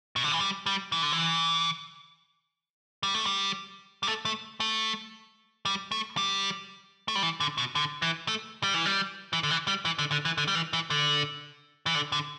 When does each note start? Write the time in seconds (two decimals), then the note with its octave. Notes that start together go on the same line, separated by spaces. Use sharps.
0.16 B2
0.24 D3
0.32 E3
0.41 G3
0.66 G3
0.92 E3
1.02 D3
1.12 E3
3.03 G3
3.15 A3
3.26 G3
4.03 G3
4.07 A3
4.25 A3
4.60 A3
5.65 G3
5.92 A3
6.17 G3
7.08 A3
7.15 G3
7.23 E3
7.40 D3
7.58 B2
7.75 D3
8.02 E3
8.28 A3
8.63 G3
8.74 E3
8.86 G3
9.33 E3
9.43 D3
9.50 E3
9.68 G3
9.85 E3
9.99 D3
10.12 D3
10.25 E3
10.38 D3
10.48 G3
10.55 E3
10.73 E3
10.90 D3
11.86 E3
11.95 D3
12.12 D3